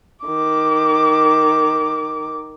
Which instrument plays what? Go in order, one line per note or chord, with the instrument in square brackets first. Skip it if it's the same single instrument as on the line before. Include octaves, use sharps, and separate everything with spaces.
[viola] D#3 D6